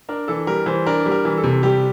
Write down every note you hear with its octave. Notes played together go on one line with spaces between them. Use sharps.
D4 A#4
E3 A4
G3 A#4
E3 C5
D4 A#4
G3
A#4
E3
A4
C3
G3 G4